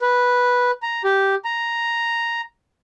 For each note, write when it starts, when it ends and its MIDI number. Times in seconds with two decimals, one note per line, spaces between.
0.02 0.71 71
0.82 1.02 82
1.04 1.35 67
1.45 2.41 82